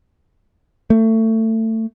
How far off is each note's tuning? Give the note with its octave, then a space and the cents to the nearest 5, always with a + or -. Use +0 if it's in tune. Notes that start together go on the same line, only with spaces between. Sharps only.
A3 +25